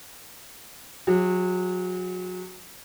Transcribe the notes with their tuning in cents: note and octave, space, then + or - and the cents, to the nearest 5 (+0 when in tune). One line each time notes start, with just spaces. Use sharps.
F#3 -25 G#4 -45